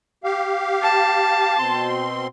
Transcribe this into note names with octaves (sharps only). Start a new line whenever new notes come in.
G4 F5
A5
B2 C4 C6